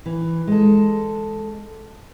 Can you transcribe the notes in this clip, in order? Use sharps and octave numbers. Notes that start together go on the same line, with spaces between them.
E3
G#3 A4